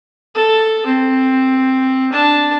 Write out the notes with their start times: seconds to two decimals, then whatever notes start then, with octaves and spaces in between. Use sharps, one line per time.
0.35 A4
0.86 C4
2.12 D4 A5